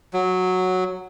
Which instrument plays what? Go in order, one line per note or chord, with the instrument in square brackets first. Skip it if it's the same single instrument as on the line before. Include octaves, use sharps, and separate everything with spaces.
[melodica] F#3